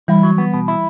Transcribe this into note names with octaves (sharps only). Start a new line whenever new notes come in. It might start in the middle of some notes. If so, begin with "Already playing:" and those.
E3 G3 E4
F#3
B3
B2
E4